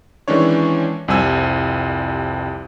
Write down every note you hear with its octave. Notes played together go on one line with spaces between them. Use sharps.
D#3 E3 G#3 C#4 D4 C#5
C2 F2 G3 C4 G#5 E6